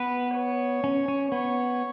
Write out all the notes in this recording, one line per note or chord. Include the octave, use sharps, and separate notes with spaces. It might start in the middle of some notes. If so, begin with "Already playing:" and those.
Already playing: B3 B4
C#5
C#4
C#4
B3 C#5